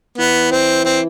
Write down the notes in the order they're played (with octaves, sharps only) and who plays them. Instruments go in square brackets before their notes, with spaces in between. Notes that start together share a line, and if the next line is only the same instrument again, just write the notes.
[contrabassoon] E3 [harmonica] B3
[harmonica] C4
C4